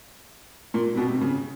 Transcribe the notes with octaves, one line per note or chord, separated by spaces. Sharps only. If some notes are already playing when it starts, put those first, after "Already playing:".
A#2
C3
B2
C3
C#3